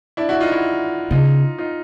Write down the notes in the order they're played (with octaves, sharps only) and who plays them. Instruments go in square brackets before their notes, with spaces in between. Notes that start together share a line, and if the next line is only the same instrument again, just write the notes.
[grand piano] D4 E4
E4 F#4
D#4 F4
E4 F#4
[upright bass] C#3 [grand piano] D#4 F4
[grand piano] D#4 F4